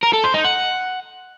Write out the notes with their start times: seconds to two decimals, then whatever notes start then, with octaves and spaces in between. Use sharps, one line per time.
0.03 A#4
0.13 A4
0.24 C5
0.34 D#4
0.44 F#5